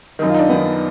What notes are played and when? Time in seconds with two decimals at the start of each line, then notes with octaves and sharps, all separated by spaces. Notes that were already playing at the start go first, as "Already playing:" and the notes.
0.19 F#2 D#3 D#4
0.29 F4
0.34 D#4
0.39 D4
0.49 F#2 D#3 B3